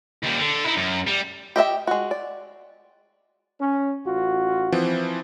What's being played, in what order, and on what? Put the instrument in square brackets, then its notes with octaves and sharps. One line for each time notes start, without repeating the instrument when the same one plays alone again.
[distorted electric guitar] D#2 G3
D3
D#4 E4
F#2
G3
[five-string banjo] G4 D#5 E5 G5
G#3 F#4
D5
[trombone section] C#4
A1 F4 F#4
[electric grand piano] E3 F3 C4